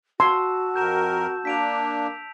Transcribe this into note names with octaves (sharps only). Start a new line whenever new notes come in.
F#4 A5 C6 E6 E7
F2 A#4 G6 E7
A#3 D4 B6 D7 F7